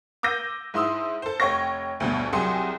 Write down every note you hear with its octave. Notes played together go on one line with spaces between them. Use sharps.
D6 E6 G6 A#6 D#7
G#2 E4 C6 D#6 E6
A4 C5
F1 C#5 G5 C#6 A#6
D2 G2 B2
C2 F#3 G#4 G5 C6 C#7